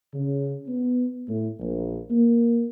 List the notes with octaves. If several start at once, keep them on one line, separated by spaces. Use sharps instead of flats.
C#3
B3
A2
A#1
A#3